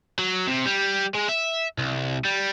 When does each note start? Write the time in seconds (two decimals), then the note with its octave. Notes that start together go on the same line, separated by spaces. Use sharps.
0.19 F#3
0.47 C3
0.66 G3
1.15 G#3
1.29 E5
1.78 C2
2.25 G3